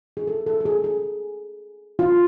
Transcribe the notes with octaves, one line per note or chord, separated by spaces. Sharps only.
G#4
A4
A4
A4
G#4
G#4
F4